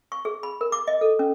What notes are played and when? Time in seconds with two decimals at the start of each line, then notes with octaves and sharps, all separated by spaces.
0.12 C#6
0.25 G#4
0.43 B5
0.61 A#4
0.72 D6
0.88 D#5
1.01 A4
1.19 C#4